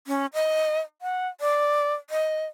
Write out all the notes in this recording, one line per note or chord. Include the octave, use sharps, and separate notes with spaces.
C#4
D#5
F#5
D5
D#5